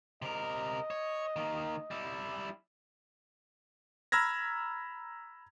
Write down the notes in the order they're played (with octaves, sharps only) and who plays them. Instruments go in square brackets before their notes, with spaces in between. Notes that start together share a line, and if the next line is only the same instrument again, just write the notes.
[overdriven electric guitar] C3 A#4 [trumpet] D#5
[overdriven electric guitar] C#5
D#3 A#3
G3 E4
[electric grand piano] A#5 B5 E6 F6 G#6 A#6